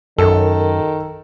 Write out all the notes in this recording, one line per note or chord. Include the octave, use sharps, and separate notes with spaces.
F#2 D#3 A4